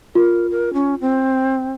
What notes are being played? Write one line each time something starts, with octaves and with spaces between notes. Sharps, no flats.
F4 A#4
A#4
C#4
C4